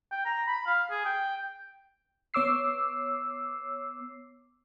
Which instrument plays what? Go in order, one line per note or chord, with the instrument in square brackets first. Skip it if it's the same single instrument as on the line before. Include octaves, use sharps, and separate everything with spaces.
[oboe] G5
A#5
B5
F5
G#4
G5
[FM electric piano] B3 C#5 D6 E6 C7